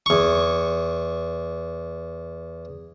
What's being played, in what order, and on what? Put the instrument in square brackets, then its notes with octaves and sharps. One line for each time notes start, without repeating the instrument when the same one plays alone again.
[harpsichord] E2 C#6